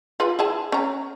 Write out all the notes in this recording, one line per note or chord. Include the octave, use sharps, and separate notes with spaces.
F4 G#4 B4
E4 G#4 A5
C#4 A#5